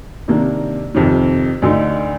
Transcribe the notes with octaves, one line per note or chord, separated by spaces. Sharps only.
C3 D#3 A#3 D4
F2 C3 D#3
D2 D3 A3 D#4